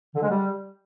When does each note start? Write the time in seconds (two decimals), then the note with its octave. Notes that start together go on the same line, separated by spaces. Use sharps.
0.15 D3
0.22 G#3
0.29 G3